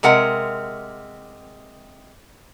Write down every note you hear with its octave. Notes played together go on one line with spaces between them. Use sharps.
C3 G#3 A#4 F#5